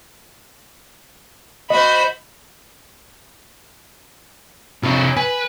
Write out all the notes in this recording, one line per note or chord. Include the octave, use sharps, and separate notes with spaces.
F#4 C5 D#5 B5
F2 C3 D#4 C#5
B4 G#5